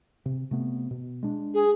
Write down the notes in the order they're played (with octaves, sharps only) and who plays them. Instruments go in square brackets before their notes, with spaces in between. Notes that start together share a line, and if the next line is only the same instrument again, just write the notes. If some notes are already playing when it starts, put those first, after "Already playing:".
[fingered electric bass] C3
C3 A3 B3
B2
G#3 D4
[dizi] G#4